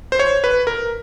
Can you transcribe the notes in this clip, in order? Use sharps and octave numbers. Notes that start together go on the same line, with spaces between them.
C5
C#5
B4
A#4